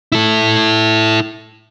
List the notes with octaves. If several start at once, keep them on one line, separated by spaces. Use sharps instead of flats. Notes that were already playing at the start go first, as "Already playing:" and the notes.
E4 A4